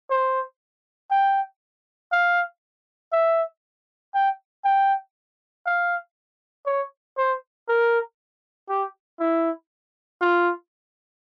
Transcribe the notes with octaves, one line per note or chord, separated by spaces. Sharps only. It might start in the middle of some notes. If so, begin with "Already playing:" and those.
C5
G5
F5
E5
G5
G5
F5
C#5
C5
A#4
G4
E4
F4